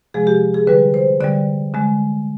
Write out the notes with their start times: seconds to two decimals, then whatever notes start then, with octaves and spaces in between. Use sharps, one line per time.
0.14 C3 F3 G#3 G#4
0.27 G4
0.54 G#4
0.67 D3 G3 B4
0.94 C5
1.21 D3 G3 D5
1.74 D3 G#3